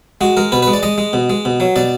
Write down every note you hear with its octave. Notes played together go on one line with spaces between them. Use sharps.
G#3 F#4
G#3 A#4
B2 B4
G#3 B4
D5
G#3 D#5
G#3
B2
G#3
B2
F#3
B2 D5